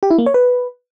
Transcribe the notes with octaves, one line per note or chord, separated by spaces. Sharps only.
G4
E4
A#3
C#5
B4